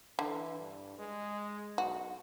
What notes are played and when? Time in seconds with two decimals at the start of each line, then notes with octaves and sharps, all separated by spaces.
0.19 D3 E3
0.59 G2
0.98 G#3
1.78 B1 F#4